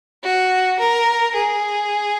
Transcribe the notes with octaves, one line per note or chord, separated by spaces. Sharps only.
F#4
A#4
G#4